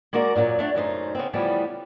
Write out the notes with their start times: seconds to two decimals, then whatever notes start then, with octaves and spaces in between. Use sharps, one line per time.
0.13 G#3 A#3 F#4 A#4 D5 A#5
0.35 F#2 A#2 D3 F#3
0.59 A3 D4 C#5 F#5
0.75 F#2 C#3 A3 D#4 C5
1.15 C#3 B3 C4
1.33 C#3 E3 F3 G3 A3 B3